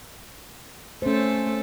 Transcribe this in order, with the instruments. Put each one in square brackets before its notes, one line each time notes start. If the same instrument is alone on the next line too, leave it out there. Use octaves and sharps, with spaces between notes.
[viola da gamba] A3 A4 [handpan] C#4 C5